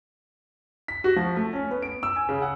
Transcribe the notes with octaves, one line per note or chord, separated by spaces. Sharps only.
B6
F#4
F3
A3
C#4
B3
D7
E6
G#5
C#3
F#5